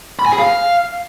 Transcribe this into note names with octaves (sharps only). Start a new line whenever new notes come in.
B5
G#5
G#4
F5